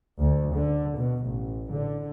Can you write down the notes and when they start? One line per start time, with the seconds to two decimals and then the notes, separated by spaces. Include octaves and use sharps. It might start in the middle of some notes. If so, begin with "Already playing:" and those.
0.21 D2
0.54 D3
0.96 B2
1.26 A1
1.70 D3